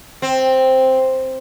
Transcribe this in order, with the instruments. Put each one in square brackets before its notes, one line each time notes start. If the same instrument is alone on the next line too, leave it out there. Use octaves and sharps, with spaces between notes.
[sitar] C4